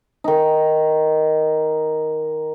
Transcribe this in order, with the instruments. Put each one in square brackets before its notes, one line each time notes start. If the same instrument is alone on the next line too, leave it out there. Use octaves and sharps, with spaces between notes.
[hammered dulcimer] D#3 D#4